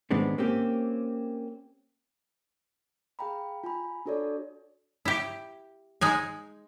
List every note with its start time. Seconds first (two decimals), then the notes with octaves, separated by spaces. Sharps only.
0.11 G#2 D#3 G#3 B3 C4 D4
0.38 A#3 C4 C#4 G4
3.19 G#4 F5 G5 A#5 B5
3.64 F4 G#5 A#5 B5
4.06 D4 F#4 A4 C#5 D5
5.05 E4 G4
6.01 G#3 D#4 G#5